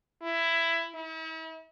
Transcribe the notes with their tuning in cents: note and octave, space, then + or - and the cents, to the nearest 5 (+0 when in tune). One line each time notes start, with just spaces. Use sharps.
E4 +10
E4 -45